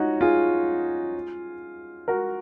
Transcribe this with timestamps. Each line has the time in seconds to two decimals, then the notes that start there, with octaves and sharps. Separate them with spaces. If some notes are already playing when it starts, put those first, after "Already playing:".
Already playing: C#4 D#4 F4 F#4
0.21 F4 G#4
2.08 F#4 A#4